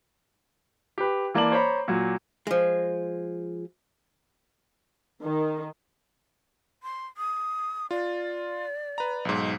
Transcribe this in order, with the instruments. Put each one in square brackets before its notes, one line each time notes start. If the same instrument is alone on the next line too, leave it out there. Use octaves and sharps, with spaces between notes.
[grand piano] G4 B4
E3 A#3 D5 A5 D6 F#7
C5 C#5 A#5 B5
A#2 F#3
[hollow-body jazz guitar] F3 G#3
[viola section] D#3
[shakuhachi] C6
D#6
[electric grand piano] F4 [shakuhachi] D5
[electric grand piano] B4 A#5
B1 G#2